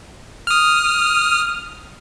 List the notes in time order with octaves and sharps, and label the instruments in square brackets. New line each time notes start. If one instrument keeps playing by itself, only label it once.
[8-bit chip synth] D#6 F6